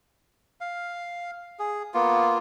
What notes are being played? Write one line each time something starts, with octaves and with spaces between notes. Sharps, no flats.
F5
G#4
A#3 B3 F4